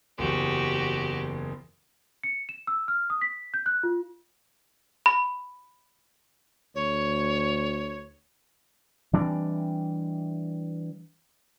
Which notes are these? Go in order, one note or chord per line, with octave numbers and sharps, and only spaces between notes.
F#1 E2 F#4 G4
C#7
E7
E6
F6
D#6
B6
G6
F#6
F4
B5
D2 C#5
E3 G3 C4 D4